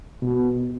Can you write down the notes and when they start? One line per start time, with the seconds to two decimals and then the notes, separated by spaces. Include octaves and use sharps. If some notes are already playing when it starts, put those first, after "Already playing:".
0.22 B2